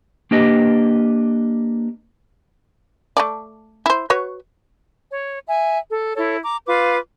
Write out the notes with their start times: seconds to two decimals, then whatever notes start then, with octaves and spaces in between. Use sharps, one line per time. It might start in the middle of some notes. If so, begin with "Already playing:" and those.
0.31 A#3 D4 G4 B4 D#5
3.17 A3 A4 D5
3.86 E4 C5
4.10 F#4 B4 C#5
5.11 C#5
5.46 E5 G#5
5.90 A4
6.15 E4 A4 C#5
6.42 A#5 D6
6.66 F4 B4 F5 D6